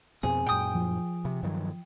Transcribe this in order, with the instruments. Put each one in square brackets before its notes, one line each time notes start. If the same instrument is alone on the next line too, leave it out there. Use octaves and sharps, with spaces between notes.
[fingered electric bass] F2 B2 C4 [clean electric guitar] G#4
[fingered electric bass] F#2 A#2 [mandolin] G5 D#6
[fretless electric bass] F3
[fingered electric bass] C3
G2 D#3 F#3